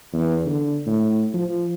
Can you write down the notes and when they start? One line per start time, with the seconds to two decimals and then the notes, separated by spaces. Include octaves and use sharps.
0.13 E2
0.45 D3
0.86 A2
1.34 F3